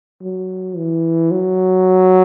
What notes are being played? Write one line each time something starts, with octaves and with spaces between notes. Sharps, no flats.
F#3
E3
F#3